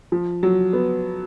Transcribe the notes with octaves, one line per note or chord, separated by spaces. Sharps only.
F3
F#3
B3